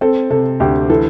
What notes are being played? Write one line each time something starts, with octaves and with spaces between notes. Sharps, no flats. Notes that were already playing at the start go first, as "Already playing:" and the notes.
C4 A4
C3 A4
D2 G4
E3 A4